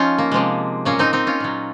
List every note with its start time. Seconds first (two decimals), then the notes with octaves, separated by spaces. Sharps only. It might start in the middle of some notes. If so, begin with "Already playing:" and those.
Already playing: F3 C#4 D#4 F4
0.18 A#3
0.32 C3 F3 G#3
0.85 A#2 F#3 A#3 C#4
0.99 C4 D#4
1.13 C4 D#4
1.27 C#4 F4
1.40 A#2 F#3